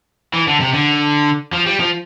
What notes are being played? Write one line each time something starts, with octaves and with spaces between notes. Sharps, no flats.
E3
D3
C3
D3
F3
G3
F3